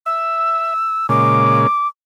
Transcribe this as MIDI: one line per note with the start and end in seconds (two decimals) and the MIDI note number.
0.06 0.74 76
0.06 1.07 88
1.09 1.67 46
1.09 1.67 49
1.09 1.67 56
1.09 1.88 86